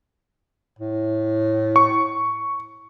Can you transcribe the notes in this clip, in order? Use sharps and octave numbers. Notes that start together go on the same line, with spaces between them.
A2
C#6